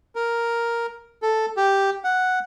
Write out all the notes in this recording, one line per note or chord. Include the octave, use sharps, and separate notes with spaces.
A#4
A4
G4
F#5